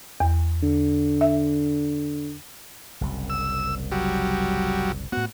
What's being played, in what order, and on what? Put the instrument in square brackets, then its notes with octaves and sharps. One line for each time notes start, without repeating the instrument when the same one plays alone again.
[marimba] E2
[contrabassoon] D3
[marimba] E5
[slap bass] F#1 C2 F#2
[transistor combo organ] E6
F#3 G3
[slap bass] A2 B3 [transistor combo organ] F#4